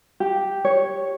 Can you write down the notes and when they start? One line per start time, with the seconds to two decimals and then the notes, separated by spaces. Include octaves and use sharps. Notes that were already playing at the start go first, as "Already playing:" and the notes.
0.20 G4
0.65 C#5